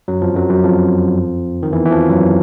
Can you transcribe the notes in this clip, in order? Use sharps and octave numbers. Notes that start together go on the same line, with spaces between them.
F#2 F#3
F2 F3
F#2 F#3
F#2 F#3
F2 F3
D#3
E2 E3
E3
F2 F3
F#2 F#3